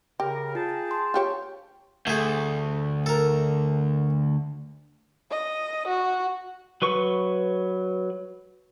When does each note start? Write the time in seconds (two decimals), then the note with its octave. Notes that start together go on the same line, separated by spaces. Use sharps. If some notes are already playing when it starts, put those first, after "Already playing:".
0.20 C#3 G4 A#4
0.55 F4 G#4 G5 A5
0.91 C6
1.14 F4 G4 C#5
2.07 D2 A3 G#4
3.06 A4 A#4
5.31 D#5
5.88 F#4
6.82 F#3 B4 C#6